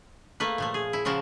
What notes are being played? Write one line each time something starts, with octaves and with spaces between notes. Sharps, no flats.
A3 A#3 B4
A#2 F3 A3
G#4
E4
C#3 F3 F#4 A#4 A5